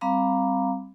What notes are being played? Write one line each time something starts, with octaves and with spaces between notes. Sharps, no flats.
G3 C4 F5 A#5 B5 D6